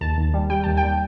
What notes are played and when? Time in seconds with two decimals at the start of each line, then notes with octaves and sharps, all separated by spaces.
0.01 D#2 A5
0.17 D#2
0.34 G3
0.50 G3 G5
0.64 D#2 A5
0.77 G5
0.83 G3